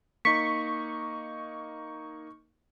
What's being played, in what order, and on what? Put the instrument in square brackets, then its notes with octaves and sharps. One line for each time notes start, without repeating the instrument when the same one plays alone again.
[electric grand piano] A#3 D#4 [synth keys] C#6 [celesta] B6